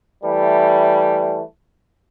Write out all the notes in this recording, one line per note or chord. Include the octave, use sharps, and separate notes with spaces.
E3 G3 A3